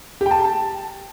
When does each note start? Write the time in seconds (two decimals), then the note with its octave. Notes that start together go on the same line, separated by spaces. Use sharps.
0.21 G4
0.26 G5
0.31 A5